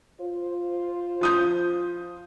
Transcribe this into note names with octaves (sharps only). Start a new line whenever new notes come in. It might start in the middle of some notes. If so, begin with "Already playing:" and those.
F4 C5
F3 D#6 G6